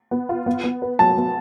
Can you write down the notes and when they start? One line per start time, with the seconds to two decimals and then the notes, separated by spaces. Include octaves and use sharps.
0.11 B3
0.29 F4
0.46 B3
0.64 B3
0.82 B4
0.99 F#3 A5
1.17 B3